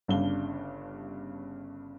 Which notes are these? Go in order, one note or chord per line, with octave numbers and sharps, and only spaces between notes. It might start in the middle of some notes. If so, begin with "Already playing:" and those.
G1 G2 C#3 D4 F5 G7